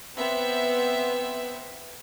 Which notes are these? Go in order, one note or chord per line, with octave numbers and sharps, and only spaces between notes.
B3 C4 E5